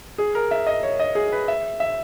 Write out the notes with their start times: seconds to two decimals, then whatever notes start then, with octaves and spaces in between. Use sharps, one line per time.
0.18 G#4
0.35 A#4
0.51 E5
0.67 D#5
0.83 C#5
1.00 D#5
1.15 G#4
1.32 B4
1.48 E5
1.80 E5